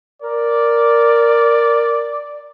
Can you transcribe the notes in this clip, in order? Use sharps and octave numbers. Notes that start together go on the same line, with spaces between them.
A#4 D5